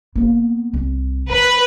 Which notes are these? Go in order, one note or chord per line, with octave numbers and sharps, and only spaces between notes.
A#3 B3
C2
F3 B4